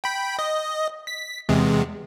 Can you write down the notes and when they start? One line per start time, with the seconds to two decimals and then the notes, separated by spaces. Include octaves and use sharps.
0.04 G5 B5
0.39 D#5
1.07 B6
1.49 E2 C3 G#3